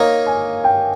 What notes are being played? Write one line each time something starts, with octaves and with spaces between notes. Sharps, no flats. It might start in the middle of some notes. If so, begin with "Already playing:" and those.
Already playing: A#3 D#4 A#4 C#5 F5
G#5
G5